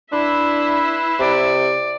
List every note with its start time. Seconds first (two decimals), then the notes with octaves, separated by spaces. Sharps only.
0.12 D4 E4 B4 E5 C6 F#6
1.19 C3 D5